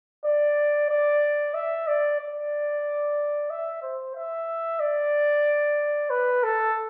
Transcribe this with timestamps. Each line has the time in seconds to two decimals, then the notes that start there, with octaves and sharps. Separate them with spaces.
0.25 D5
0.90 D5
1.54 E5
1.87 D5
2.20 D5
3.50 E5
3.83 C5
4.15 E5
4.80 D5
6.10 B4
6.44 A4